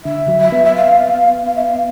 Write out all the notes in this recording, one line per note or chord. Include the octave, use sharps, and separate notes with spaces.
D3 E5
F#3
E5
B3
E5
F5
F5
E5
F5